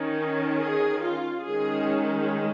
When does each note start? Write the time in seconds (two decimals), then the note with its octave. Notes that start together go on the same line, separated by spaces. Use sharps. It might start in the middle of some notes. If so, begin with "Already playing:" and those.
Already playing: D#3 C#4
0.58 G#4
1.03 F4
1.46 D#3 G#3 C#4 G#4